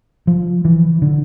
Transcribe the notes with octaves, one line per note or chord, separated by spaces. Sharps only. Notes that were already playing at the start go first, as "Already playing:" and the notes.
F3
E3
D3